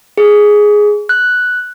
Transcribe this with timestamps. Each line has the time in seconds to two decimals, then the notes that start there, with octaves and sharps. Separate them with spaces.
0.18 G#4
1.09 F#6